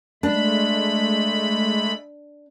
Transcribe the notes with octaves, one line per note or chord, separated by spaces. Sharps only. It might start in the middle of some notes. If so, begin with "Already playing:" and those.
G#3 A3 D4 B5